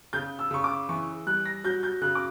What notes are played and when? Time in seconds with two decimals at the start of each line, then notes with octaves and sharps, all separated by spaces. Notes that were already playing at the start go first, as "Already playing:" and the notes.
0.13 C#3 G6
0.39 E6
0.51 C#3 C#6
0.64 D6
0.89 E3 C#6
1.26 G3 F#6
1.45 A#6
1.64 F#3 G6
1.83 G6
2.02 C#3 F#6
2.15 D6